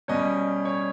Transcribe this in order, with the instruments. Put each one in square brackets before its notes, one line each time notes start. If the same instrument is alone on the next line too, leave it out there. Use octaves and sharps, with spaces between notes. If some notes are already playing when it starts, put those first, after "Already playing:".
[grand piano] B2 G3 C#4 D#5
C#5